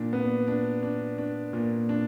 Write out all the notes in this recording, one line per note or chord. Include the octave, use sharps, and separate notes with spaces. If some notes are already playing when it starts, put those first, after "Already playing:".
Already playing: A#2 D4
B3
D4
D4
D4
A#2
D4